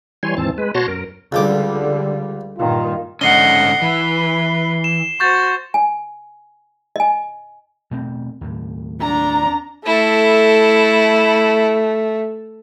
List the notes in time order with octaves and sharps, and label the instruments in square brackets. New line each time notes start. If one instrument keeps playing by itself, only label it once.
[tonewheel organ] E3 G3 C#5 G#5 C6
D#2 G#2 E3 C4 A5
G#3 B4
B2 F#4 C#5 A5 C6 A#6
F#2 A#4
[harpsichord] C#2 F3 D6 [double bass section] D3 G3
[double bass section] G2 A#2 D#3 [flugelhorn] F4
[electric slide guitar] G#2 D3 C#4 [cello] D#5 F#5 [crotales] C7 G7
[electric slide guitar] E3 [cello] B4
[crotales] E7
[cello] F#4 C5 [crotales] C#6 G6 A6
[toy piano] G#5
D#5 G#5
[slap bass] B2 A3 C4
D#2 A2
[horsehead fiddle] D4 A#5
[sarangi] A3 [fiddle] E4 A4